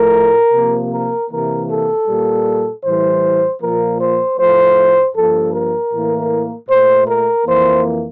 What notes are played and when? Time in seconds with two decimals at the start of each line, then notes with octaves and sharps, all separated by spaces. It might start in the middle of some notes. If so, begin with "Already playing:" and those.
Already playing: A2 F3 A3 A#4
0.52 C3 F3 A#3
0.90 A#4
1.29 C3 E3 A#3 A#4
1.68 A4
2.06 A#2 G3 A#3
2.83 A2 E3 G3 C5
3.60 A#2 F3 A#3 A#4
3.99 C5
4.37 A2 F3 A3 C5
5.14 G2 F3 A#3 A4
5.53 A#4
5.92 A2 E3 A#3
6.69 A#2 A3 C5
7.07 A#4
7.45 F2 E3 A#3 C5